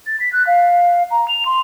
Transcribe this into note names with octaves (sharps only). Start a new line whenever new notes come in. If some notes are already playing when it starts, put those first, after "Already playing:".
A6
B6
F#6
F5
A#5
F7
C6